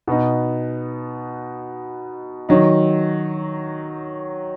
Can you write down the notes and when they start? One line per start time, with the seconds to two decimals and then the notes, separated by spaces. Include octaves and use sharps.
0.07 B2 B3 D#4
2.49 D#3 F#3 D#4